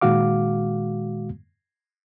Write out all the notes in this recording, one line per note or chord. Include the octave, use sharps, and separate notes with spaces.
A#2 D#3 G#3 F#4 F5 D6